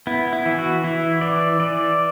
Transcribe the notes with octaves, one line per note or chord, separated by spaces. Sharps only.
B3 E4
E4
E3
F#4
E3 E4
E3 D5
E3 D5